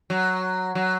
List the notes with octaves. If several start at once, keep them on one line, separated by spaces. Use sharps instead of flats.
F#3
F#3